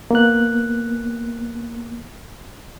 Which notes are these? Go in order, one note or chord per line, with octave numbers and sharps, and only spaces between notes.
A#3 B3 F#6